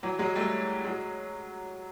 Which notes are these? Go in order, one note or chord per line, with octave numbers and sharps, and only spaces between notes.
E3 F#3
F#3 G#3
G3 A3
F#3 G#3